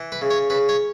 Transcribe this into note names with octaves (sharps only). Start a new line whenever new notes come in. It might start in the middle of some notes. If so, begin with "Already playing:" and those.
Already playing: E3
B4
C#3
C#5
C#3 B4
C#5